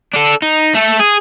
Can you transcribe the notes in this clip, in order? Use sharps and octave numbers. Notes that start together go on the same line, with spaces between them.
D4 A4
D#4
A3 A4
G#4